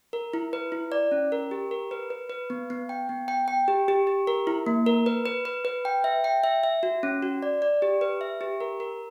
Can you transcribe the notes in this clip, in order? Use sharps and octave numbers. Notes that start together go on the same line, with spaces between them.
A#4
E4
B4
E4
D5
C#4
A#4
G4
A#4
B4
B4
B4
B3
B3
G5
B3
G5
G5
G4
G4
G4
A#4
E4
A#3
A#4
B4
B4
B4
B4
G5
E5
G5
E5
E5
F#4
C#4
F#4
D5
D5
G4
B4
E5
G4
A#4
A#4